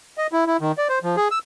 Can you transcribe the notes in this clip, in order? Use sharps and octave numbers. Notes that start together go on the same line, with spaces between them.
D#5
E4
E4
D#3
D5
C5
F3
G#4
E6